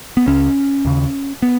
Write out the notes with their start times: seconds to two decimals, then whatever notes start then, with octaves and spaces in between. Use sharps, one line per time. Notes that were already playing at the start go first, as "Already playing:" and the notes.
0.17 B3
0.27 C#2 C#3 C#4
0.85 D#2 C#3
1.42 B3